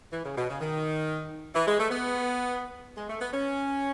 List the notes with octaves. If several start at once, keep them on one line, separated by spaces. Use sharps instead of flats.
E3
C#3
B2
C#3
D#3
E3
G#3
A3
B3
G#3
A3
B3
C#4